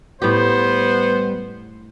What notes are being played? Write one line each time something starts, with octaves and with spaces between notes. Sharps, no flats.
A2 G3 B3 G4 C5